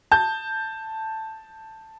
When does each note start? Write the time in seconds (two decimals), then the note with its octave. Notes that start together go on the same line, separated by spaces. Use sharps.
0.12 A5 G6